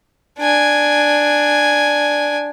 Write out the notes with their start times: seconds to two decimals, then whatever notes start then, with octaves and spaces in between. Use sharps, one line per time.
0.39 D4 G#5